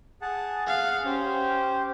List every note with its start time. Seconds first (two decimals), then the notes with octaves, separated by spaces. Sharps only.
0.22 G#4 F#5 A5
0.67 G#4 F5 F#5 F#6
1.05 C#4 G4 C5